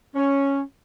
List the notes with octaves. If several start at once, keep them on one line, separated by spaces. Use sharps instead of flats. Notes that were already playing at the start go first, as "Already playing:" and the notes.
C#4